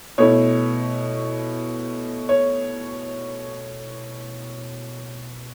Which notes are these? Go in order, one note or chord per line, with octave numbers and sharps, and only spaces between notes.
B2 A3 E4 C#5
C#5